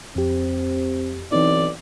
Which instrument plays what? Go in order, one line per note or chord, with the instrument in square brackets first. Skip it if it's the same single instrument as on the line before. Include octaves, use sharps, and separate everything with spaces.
[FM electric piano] F2 G4 [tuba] C4
[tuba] B1 [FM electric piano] E3 C4 D#4 [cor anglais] D5